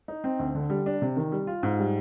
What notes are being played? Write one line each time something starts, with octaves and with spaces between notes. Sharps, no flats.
D#4
C4
D2
D3
G3
D4
C3
D#3
G3
F4
G#2
G3